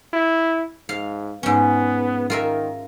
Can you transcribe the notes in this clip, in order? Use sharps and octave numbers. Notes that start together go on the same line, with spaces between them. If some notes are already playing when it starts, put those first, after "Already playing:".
E4
G#2 F5
G#2 B3 C#4
D#3 F4 A#4 E5